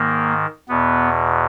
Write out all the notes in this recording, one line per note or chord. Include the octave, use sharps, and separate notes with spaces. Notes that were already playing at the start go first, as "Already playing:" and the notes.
Already playing: G#2 D#3 A#3
E2 B2 B3